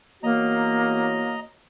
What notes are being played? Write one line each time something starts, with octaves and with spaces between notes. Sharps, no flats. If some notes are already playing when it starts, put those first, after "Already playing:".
E2 A#3 F#4 C#5 D#5 A#5